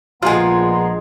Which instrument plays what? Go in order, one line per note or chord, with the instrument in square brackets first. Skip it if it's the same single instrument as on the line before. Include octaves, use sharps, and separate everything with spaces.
[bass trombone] A#1 [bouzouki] F3 G#3 [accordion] B3 A#5 C6 [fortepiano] F4 G#4